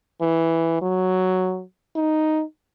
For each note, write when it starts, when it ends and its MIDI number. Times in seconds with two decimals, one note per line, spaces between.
0.21 0.79 52
0.81 1.62 54
1.96 2.43 63